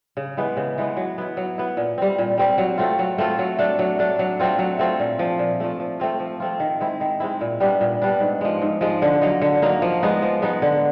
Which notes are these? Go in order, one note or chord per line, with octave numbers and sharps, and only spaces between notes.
C#3
E3 G#3 B3
C#3
E3 G#3 B3
F#3
B3 E4
F#3
B3 E4
A#2
G3 C4
A#2
G3 C4
F#3
A3 C4 F4
F#3
A3 C4 F4
F#3
A3 D4
F#3
A3 D4
F#3
A3 C4 F4
F#3
A3 C4 F4
A#2
F3 A3
A#2
F3 A3
F3
A3 C4 F4
F3
A3 C4 F4
D#3
G#3 C4 E4
D#3
G#3 C4 E4
A#2
G3 B3 D4
A#2
G3 B3 D4
G#2
F3 G#3
G#2
F3 G#3
D3
F#3 A#3 D#4
D3
F#3 A#3 D#4
F3
G#3 B3 D#4
F3
G#3 B3 D#4
D3